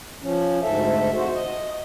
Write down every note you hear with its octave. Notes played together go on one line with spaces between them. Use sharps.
F3 C#4
D2 G#2 A4 E5
F2 F#4 C5
D#5